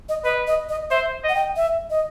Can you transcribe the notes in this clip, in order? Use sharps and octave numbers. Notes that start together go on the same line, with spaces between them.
D#5
B4 D#5
D#5
D#5
C5 E5
D#5 F#5
G5
E5
D#5